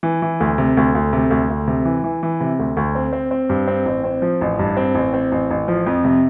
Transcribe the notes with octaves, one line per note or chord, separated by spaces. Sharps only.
E3
E3
D2
C3
D2
D2
C3
D2
D2
C3
E3
E3
E3
C3
D2
D2
C4
C4
C4
G2
C4
A1
C4
F3
A1
G2
C4
A1
C4
A1
A1
F3
F2
C3